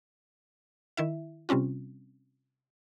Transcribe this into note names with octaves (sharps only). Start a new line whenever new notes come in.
D#3 E4 E5
C3 G3 C4 C#4 F4